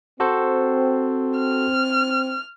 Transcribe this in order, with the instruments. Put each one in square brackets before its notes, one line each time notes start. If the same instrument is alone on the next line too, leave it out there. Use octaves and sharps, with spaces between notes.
[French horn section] C4 [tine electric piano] F#4 A4 C5
[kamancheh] F6